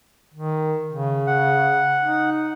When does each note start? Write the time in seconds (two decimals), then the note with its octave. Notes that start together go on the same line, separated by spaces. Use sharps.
0.34 D#3
0.92 C#3
1.27 F#5
2.02 D#4